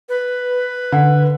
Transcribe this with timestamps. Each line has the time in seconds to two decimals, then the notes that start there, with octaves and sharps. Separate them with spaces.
0.09 B4
0.92 D3